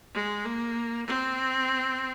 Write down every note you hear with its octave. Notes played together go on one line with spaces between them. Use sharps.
G#3
A#3
C4